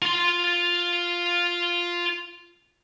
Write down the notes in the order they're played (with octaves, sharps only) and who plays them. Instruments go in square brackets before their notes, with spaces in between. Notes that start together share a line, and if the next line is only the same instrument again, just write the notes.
[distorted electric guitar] F4 C6